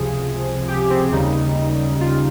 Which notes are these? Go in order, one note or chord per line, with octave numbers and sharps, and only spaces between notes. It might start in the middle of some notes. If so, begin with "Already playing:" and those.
Already playing: C#2 C3 F3 G#4
G4
C4
D#2 C#3 G3 D#4
F4